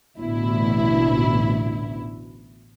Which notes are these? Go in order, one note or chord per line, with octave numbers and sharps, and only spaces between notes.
A1 D2 B2 E4